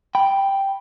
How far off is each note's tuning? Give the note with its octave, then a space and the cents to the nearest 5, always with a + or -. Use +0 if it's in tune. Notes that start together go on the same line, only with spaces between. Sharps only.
G5 +0 B5 -5